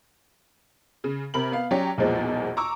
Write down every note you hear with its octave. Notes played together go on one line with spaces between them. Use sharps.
C#3
C3 A#4 B5 F#7
B3 F5
F#3 C#4 G4 D5
B1 E2 A#2 F3 G#3
A#5 C#6 D6 E6